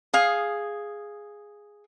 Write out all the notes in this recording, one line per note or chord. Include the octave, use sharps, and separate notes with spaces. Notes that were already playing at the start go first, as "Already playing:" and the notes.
G#4 F5